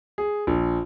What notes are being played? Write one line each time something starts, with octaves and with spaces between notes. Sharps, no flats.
G#4
A#1